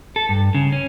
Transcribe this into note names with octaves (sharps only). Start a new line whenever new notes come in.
A4
G2
C#3
C#4